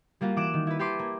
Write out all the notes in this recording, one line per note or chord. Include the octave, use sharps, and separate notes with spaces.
G3 A#3 F4 F#4
E3 F#4 D6 F#6 D7 E7
D#3
E4 B4
G4 A4 B4 C6 D6
A#3